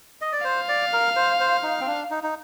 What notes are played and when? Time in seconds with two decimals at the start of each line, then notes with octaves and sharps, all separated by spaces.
0.21 D#5
0.33 D5
0.44 C5 F5
0.69 D5
0.93 A#4
1.16 C5
1.40 C5
1.63 D#4
1.81 C4
1.87 D4
2.11 D#4
2.23 D#4